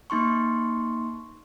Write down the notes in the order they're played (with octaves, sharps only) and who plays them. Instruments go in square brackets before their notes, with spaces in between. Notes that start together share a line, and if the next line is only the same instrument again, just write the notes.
[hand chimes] A#3 D#4 C6 C#6